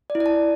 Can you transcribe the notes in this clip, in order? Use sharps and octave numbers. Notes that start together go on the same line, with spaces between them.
D5
E4
D5
A5